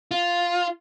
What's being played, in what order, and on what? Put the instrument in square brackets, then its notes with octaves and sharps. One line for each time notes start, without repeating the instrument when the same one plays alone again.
[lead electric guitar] F4